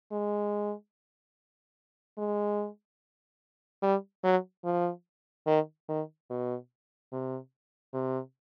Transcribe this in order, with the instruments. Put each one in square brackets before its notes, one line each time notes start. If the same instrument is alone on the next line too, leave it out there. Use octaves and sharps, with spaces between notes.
[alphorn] G#3
G#3
G3
F#3
F3
D#3
D#3
B2
C3
C3